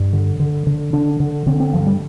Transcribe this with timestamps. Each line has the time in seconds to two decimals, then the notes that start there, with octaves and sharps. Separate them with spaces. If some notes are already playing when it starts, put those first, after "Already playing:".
Already playing: G2
0.13 D3
0.39 D3
0.67 D3
0.93 D3 D4
1.20 D3
1.46 D3 C4
1.60 C4
1.73 G2 F3
1.87 G3